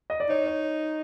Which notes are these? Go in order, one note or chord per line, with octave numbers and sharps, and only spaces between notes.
D#5
D5
D#4 C#5
C#5